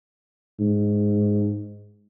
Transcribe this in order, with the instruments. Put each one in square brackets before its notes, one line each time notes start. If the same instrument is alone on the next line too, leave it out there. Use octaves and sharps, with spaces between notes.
[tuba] G#2